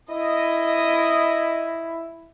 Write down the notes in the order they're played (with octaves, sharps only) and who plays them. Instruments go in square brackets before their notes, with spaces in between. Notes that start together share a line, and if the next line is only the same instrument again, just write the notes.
[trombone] E4 [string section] D#5